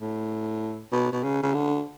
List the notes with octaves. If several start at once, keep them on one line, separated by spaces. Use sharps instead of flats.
A2
B2
B2
C#3
C#3
D3